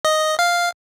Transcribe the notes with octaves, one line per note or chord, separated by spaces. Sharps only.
D#5
F5